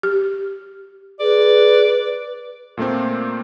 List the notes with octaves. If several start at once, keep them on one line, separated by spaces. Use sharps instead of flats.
G4
G#4 B4 D5
A#2 A3 A#3 C4